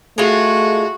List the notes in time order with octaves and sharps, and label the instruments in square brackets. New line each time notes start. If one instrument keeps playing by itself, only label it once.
[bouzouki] G#3 F4 [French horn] A3 [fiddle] F#4